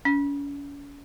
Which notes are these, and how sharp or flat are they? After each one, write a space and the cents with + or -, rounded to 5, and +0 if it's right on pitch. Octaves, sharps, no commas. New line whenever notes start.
C#4 +40